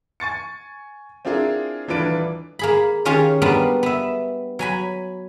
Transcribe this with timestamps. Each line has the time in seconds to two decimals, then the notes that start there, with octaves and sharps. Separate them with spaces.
0.20 G#5 C#6 A6 C#7
1.25 C4 D4 E4 F4 G#4 A#4
1.88 D#1 E3 D4 F4 B4 D7
2.59 A#3 G#4 B5
3.05 D#3 C#4 F4 G4 G#4 C#5
3.42 G3 A#3 B3 D4 F4
3.83 B3 E5
4.59 F#3 G#5 B5